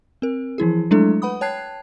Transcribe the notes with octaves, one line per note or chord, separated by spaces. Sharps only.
C4 A#4
E3 F3 E4 G#4
F#3 G#3 A3 D4 E4 A4
B4 F#5 B5 D#6
C#5 G5 A5 F#6 G#6 C7